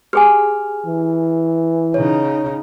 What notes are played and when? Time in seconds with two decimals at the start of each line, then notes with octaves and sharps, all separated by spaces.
0.13 G4 G#4 G#5 F6
0.86 E3
1.94 C#3 D#4 C#5